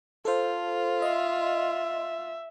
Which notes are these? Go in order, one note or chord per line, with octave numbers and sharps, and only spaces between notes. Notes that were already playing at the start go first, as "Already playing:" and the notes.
F4 A4 C5
D#5 E5 C6